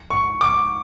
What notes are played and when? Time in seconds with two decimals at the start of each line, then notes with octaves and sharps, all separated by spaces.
0.10 C#6
0.41 D6